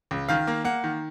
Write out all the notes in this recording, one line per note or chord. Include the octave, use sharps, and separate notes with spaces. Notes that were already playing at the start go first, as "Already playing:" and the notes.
C#2
D#3 F5
A#3
A#3 F#5
D#3